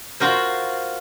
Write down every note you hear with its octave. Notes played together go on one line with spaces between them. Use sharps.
F4 F#4 A#4 C5